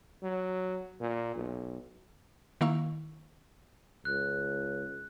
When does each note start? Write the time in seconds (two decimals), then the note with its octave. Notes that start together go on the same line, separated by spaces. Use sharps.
0.23 F#3
1.00 A#2
1.35 B1
2.61 D#3 A#3 E4 F5 C#6 E6
4.05 C#2 F#6